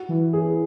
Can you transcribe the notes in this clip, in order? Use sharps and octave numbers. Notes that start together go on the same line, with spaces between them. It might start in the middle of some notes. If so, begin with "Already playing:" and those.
Already playing: F#4
E3
G#4